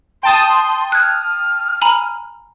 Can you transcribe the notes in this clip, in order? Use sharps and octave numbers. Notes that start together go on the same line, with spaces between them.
G5 A5 C6 D#6
F6 F#6 G#6
G#5 A#5 B5